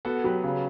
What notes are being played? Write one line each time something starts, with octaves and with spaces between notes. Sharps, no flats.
B3 F#4 A4
F#3 G4 B4
C#3